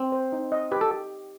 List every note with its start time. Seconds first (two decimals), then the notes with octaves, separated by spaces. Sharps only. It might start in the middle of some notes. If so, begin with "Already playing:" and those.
Already playing: C4
0.12 C5
0.32 D#4
0.52 D#5
0.72 G4 B4
0.81 A4